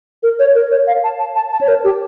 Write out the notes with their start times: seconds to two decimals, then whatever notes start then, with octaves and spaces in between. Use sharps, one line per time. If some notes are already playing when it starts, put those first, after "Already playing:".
0.23 A#4
0.39 C#5
0.55 A#4
0.71 C#5
0.87 F5
1.04 A5
1.20 A5
1.36 A5
1.52 A5
1.61 C#5
1.68 A#4
1.84 G4